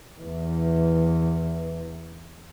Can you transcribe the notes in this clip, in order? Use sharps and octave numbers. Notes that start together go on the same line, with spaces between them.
E2 E3